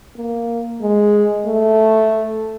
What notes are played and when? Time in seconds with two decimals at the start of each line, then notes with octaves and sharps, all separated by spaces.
0.16 A#3
0.81 G#3
1.46 A3